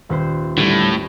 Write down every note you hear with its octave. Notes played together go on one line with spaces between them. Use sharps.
D#1 B4 C5
A2 D3 G3